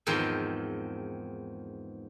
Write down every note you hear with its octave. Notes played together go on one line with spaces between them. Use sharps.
E2 G#2 D#3 F3 C4